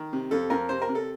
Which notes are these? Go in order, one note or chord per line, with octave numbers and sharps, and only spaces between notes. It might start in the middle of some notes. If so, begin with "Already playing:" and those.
Already playing: D#3
C3
F2 A4
F2 A#4
C3 C5
A#4
C3
A4